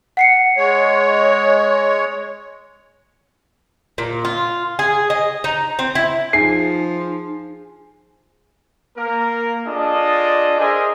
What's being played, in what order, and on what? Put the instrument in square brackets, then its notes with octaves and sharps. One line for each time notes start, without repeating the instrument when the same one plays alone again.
[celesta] F#5 C7 C#7
[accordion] G#3 C#5
[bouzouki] A#2
F4
G#4
D#5
D#4
C4
E4
[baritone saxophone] F3 [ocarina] D#4 [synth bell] G#4 G#5 [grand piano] C7
[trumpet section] A#3 A#4
D4 F4 G#4 A4 D5 D#5
G#4 A#4 C5 D#5 E5 G#5